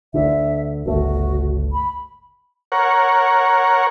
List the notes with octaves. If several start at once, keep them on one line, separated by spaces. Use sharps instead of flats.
D2 D3 E5
G1 C#2 A3 F#4
B5
A#4 C#5 F#5